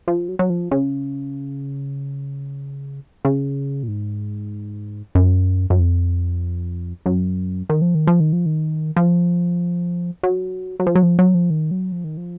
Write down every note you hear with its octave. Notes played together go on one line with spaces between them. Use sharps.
F3
F#3
F#3
F3
C#3
C#3
A#2
G#2
F#2
F#2
F2
F#2
D#3
F3
D#3
F3
D#3
F3
D#3
F3
F#3
F#3
F3
F#3
F3
F#3
F3
D#3
F#3
F3
D#3
F3